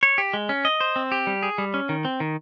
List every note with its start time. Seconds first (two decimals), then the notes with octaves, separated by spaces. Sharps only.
0.03 C#5
0.18 G4
0.34 G#3
0.49 C#4
0.65 D#5
0.81 C5
0.96 C4
1.12 G4
1.27 G3
1.43 G#4
1.58 G3
1.74 C#4
1.89 D#3
2.05 C4
2.20 D#3